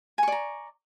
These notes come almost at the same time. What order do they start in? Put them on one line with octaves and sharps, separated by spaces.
G#5 C#6 D5 A#5